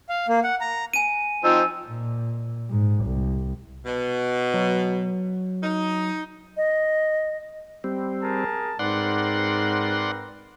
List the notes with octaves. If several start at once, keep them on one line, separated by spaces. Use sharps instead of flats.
F5
A#3
F#5
A#5
G#5 D#7
F3 C4 D#4 E6
A#2
G#2
C2
B2
F#3
D#4
D#5
G3 C4
G#4 A#4 A5
G#2 C4 A#4 B4 D5 F#5 C6